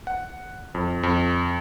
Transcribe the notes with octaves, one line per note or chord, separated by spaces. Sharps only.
F#5
F2
F2